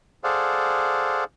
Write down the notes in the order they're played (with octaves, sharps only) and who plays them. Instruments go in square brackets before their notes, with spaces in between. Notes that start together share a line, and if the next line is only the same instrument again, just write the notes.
[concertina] G#4 A4 C5 D5 F5 F#5